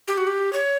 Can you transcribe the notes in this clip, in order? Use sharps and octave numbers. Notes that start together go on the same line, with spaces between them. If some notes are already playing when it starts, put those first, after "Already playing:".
G4
F#4
G4
C#5